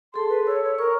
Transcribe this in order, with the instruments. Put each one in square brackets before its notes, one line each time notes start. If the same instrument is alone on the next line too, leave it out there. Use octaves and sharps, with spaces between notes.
[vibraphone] G#4 A4 A5 [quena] C6
[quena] B4
[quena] C#5 [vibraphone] E6
[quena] C#5
[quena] A#4 [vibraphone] C#6